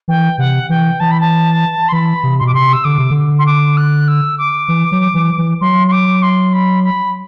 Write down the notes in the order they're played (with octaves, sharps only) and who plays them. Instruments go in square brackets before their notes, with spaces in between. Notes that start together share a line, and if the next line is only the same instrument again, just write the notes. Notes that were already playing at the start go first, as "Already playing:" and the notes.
[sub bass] E3 [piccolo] G5
[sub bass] C3 [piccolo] F#5
[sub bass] E3 [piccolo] G5
[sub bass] E3 [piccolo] A5
[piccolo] B5
A5
C6
[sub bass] E3 [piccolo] B5
[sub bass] C3
[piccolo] C6
[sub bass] B2 [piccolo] D6
[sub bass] C3 [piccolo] C6
[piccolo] E6
[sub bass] D3 [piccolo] D6
[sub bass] C3
D3
[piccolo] C6
D6
F#6
E6
D6
[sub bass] E3
F#3
E3
E3
[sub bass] F#3 [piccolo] C6
[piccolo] C6
D6
C6
B5
B5